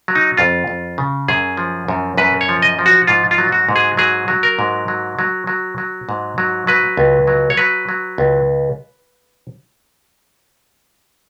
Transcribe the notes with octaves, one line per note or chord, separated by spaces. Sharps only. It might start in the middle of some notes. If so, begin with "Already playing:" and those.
F#3
D#4
F2 F4
F2
C#3
F#2 G#4
F3
F#2
F#2 B4
C#5
F3
D#5
F3
F#4
G#2 F4
F4
F#3
F#4
G#2
G#4
F#3 G#4
F#3
A#4
G#2
F#3
F#3
F#3
F#3
G#2
F#3
F#3 B4
C#2
F#3
C#5
F#3 B4
F#3
C#2